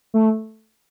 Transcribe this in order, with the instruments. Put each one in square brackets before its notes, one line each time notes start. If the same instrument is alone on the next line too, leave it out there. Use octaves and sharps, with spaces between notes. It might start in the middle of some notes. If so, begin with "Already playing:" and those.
[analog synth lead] A3